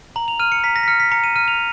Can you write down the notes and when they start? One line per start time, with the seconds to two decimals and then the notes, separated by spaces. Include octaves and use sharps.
0.16 A#5 F#7
0.28 F7
0.40 F6 D#7
0.52 C#7
0.64 A#5 B6
0.76 A#6
0.83 B6
0.88 F6 C#7
1.00 B6
1.11 A#5 C#7
1.24 D#7
1.36 F6 D#7
1.48 F7